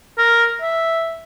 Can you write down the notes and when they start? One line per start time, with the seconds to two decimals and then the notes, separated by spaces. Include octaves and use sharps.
0.18 A#4
0.61 E5